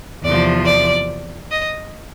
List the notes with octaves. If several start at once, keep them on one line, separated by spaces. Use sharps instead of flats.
E2 C3 F3 D5
D5
D#5